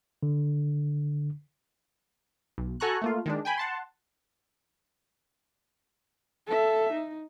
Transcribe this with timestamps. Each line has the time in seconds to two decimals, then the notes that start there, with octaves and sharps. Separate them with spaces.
0.23 D3
2.58 B1
2.80 F#4 A4 G#5 A#5 C#6 F#6
3.02 A3 A#3 F4
3.26 D#3 G#3 D4
3.45 G5 G#5 B5
3.58 F#5 A5 C6
6.47 A4 E5
6.93 D#4